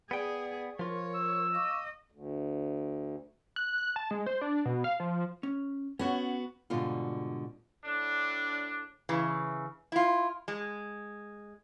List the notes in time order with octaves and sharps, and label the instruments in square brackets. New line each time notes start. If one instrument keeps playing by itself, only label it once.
[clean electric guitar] B3 G5 [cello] G#4 [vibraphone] D5
[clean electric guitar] F3 F4 [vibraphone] A#4 [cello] C#5
[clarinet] E6
[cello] D#5 [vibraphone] F5 C#6 D6
[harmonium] D2
[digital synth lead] F#6
F#6
A5
G#3
C5
D4
B2
F5
F3
[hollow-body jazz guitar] C#4
[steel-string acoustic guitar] B3 F#4 [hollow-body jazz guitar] C#4 C#5
[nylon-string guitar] G#2 B2 D3 G3 F4
[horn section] A2 D4
[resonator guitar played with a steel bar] C#3 E3
E4 F4
G#3